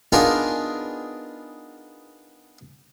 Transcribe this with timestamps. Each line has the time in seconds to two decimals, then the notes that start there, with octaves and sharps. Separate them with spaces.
0.12 B3 D4 D#4 F4 G#4 A#4